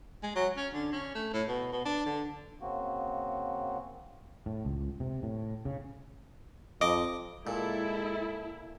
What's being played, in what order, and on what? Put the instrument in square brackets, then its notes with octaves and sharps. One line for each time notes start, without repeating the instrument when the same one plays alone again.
[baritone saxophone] G#3
F#3
C#4
D3
C#4
A3
A2
B2
B2
D4
D3
[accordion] C#3 A#3 C4 F#4
[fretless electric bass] A2
C#2
C3
A2
C#3
[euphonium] F2 [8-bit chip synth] D#5 D6
[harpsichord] A#2 [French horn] G#3 [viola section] E4 [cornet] A4